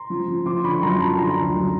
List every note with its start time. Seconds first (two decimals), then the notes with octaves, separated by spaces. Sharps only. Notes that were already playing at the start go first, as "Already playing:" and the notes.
Already playing: A#5 C6
0.10 F3
0.28 F3
0.46 F3 C6 D6
0.64 D3 B5 C#6
0.75 C#6
0.82 F#2 A#5 C6
1.00 F3 A5 B5
1.18 D3 A#5 C6
1.36 D2
1.55 F#2